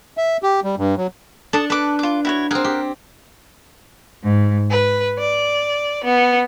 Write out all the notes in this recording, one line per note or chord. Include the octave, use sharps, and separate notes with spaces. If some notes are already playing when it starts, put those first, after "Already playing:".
E5
G4
G3
G2
F#3
D4 A4 A5 D#6
A4 B4 D6
F4 D6
E4 F#4 C#5
C4 G#4 A#4 F#5
G4
G#2
B4
D5
B3